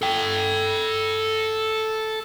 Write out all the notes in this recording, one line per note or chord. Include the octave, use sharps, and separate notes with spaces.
A4 G5